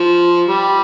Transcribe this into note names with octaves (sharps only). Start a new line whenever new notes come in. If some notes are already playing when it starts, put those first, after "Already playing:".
Already playing: F3
G3